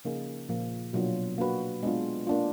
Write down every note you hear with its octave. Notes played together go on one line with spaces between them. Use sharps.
C#3 F3 A#3 D#4 G#4
A#2 F3 A#3
B2 F#3 A#3 D4 F4
A#3 D4 F#4 B4
G#3 B3 D4 F4
A#3 D4 F4